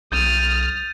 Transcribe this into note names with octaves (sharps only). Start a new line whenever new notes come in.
B1 D#6 F6 G6 A6 D#7